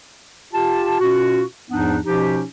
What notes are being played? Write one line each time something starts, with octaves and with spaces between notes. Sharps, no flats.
F4 G4 A5
B2 C#4 F4 F#4
E2 G#2 F3 B3 D4 D#4
B2 F3 C#4 D#4 G4